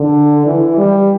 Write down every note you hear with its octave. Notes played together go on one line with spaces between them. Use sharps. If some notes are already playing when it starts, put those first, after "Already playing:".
Already playing: D3
E3
G3